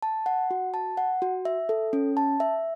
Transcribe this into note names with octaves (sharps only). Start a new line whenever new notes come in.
A5
F#5
F#4
A5
F#5
F#4
E5
A4
C#4
A5
E5